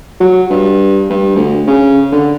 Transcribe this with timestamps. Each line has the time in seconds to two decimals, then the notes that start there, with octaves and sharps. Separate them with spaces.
0.20 F#3
0.50 G2
1.10 G2
1.36 D2
1.67 C#3
2.12 D3